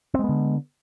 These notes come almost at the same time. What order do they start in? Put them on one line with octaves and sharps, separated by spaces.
C4 G#3 B3 D3